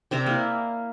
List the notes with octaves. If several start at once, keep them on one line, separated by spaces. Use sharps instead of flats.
C3 D5 E5 A#5
A#3 E4